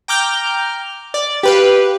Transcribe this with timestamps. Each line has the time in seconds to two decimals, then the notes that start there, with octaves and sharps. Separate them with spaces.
0.08 G5 A#5 D6 F6 G6
1.14 D5
1.43 G4 B4 F5